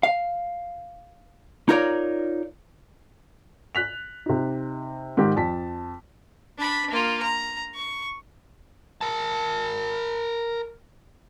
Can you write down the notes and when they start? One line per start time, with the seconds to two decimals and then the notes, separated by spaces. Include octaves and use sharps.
0.03 F5
1.69 D#4 F4 A#4 C#5 D5
3.75 F#6 B6 F7
4.26 C3 D#4
5.17 G#2 D#3 G4
5.36 F2 A5 B6
6.59 D4 B5
6.90 A#3 F4
7.23 A#5
7.75 C#6
9.01 A#4 A5